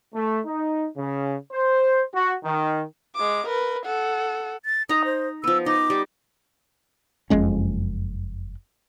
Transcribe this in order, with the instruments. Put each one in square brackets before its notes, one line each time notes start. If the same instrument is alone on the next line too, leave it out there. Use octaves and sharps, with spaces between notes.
[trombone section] A3
D#4
C#3
C5
F#4
D#3
[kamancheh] G#3 D6
A#4 B4
A4 F#5
[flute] A6
[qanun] D#4 A#5 [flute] D#6
[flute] C5
[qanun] F3 B3 [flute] E6
[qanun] D#4 [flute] D6
[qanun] G3 G4
[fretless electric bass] F#1 F2 G#3 C#4